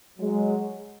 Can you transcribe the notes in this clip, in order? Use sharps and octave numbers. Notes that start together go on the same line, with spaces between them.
F#3 G#3